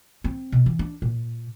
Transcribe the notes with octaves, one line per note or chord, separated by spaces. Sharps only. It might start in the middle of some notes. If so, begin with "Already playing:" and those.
C4
B2
E3
D4
A#2